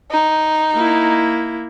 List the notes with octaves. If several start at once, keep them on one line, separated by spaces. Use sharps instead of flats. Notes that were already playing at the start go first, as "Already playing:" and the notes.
D#4
A#3 E4